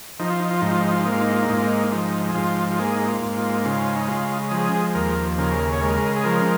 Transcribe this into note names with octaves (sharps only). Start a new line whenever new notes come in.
F3 D#4
F4
D#4
F4
G#2 D#4
F4
D#4
F4
D#4
A#3
F4
D#4
F4
D#4
G#2 F4
D#4
F3 D#4
G#4
G#2 F4
F4
A#3 G#4
D#4
F4
G#2
F4
C#3 F4
D#4
G#3 F4
F3 G#4
D#2 A#4
C#3 A#4
C#5
G#3 A#4
G#4
F3 A#4